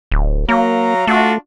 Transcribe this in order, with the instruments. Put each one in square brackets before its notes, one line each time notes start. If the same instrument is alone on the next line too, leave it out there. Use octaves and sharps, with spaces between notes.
[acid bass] D1
[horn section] F#3 F5 A#5 [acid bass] A#3
[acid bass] A3 [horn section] D4 F4 F#4